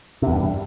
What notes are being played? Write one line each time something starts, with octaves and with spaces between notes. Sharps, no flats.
C3
E2
G2